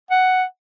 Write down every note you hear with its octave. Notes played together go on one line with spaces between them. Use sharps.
F#5